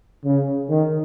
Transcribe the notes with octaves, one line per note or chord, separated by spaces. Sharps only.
C#3
D#3